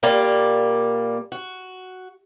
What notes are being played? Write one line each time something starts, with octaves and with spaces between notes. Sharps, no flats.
A#2 G3 A#3 D5
F#4